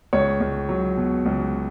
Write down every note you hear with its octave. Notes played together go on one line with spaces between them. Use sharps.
C#2 C#5
C#2
F#3
B2
C#2